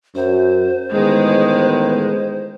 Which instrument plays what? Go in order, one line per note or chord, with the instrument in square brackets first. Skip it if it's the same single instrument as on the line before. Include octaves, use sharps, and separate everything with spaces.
[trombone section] F#2 [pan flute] C5
[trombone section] A1 D#3 B3 [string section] G#3